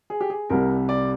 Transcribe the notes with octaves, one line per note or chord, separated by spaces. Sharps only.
G#4
G4
G#4
C2 C3 G3 A#4
D5